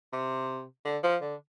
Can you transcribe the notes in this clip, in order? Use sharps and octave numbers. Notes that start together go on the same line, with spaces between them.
C3
D3
F3
D3